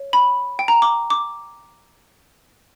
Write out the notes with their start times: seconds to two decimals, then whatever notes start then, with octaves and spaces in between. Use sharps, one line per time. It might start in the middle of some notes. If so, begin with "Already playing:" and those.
Already playing: C#5
0.13 B5
0.59 G5
0.68 A#5
0.82 D6
1.10 D6